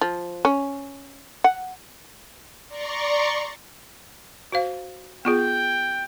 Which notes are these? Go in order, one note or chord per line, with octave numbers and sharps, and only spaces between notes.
F3
C#4
F#5
D5 A#5 C6 C#6
F#4 C5 F5
B3 F4 G#4 G5